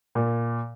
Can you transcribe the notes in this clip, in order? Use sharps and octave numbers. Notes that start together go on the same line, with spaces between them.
A#2